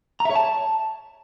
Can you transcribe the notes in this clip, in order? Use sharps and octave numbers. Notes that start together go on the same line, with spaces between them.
A#5
E5
C#5
A5